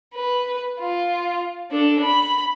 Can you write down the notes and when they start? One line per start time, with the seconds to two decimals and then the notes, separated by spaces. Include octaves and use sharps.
0.15 B4
0.80 F4
1.71 D4 A4
2.04 B5